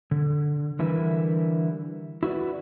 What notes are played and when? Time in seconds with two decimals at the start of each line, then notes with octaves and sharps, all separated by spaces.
0.11 D3
0.79 D3 E3 G3 E4 A#4 B4
2.23 E4 F#4 B4 D5